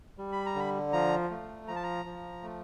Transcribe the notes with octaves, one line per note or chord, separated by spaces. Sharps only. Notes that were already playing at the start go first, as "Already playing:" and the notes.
G3
B5
A#5
D3 B5
F3 A#5
A3
F3 A#5
A5
A#5
F3
A3